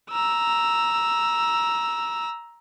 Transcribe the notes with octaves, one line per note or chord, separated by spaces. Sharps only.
A#5 E6